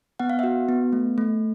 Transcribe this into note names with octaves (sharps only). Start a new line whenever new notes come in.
B3 F#5
F5
F#4 E5 F#5
B3
A3
A3